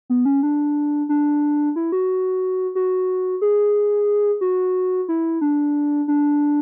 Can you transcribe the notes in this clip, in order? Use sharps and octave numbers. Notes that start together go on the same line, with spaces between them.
B3
C#4
D4
D4
E4
F#4
F#4
G#4
F#4
E4
D4
D4